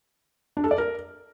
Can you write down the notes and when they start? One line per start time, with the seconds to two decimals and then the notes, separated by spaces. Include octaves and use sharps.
0.57 D4
0.64 A4
0.71 D5
0.78 A#4